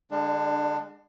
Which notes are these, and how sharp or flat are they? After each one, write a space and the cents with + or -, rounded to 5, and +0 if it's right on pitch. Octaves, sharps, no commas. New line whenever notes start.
D3 +0 G#3 -35 D4 +20